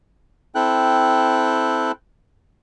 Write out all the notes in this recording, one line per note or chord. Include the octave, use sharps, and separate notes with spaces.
C4 E4 A4 G5 F#6